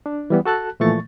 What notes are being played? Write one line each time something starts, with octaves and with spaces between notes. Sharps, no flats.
D4
E3 G3 B3
F#4 A4 A5 F#6
A#2 E3 F3 A3 C#6 A6